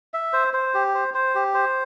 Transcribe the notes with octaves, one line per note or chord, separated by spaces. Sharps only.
E5
C5
C5
G4
C5
C5
G4
C5